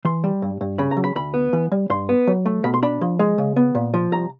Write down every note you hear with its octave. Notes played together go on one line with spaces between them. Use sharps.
E3 C6
G3
G2
G2
C#3 B5
A#5
F#3
B5
D2 B5
B3
E3
G3
G2 C6
B3
F#3
A3
B2 B5
C6
D4 B5
F3
G#3
C#3
B3
A#2
F3
C2 A#5